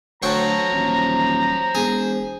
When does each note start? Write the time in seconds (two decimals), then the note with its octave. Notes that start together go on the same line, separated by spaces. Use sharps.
0.23 D2 F#3 C5 G5 A5 A#5 C#6
0.73 D#1
1.75 E1 G#4